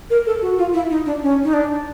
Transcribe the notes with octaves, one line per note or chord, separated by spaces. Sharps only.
A#4
A4
F#4
F4
E4
D#4
D4
C#4
D#4
D4